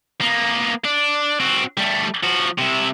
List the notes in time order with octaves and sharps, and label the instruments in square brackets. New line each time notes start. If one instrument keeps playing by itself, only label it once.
[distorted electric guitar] A#3 B3
D4
C4 F#4
G3 A3
F3 F#4
C3 E4